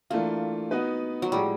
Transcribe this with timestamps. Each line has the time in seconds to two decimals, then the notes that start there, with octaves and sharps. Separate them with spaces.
0.10 E3 A3 A#3 D4 F4
0.71 B3 D#4 F#4 B4
1.22 F#3
1.32 A2 F3 G3 G#3